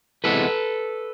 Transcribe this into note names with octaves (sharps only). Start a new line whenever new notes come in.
E2 C3 E3 G#3 B3 A4 B4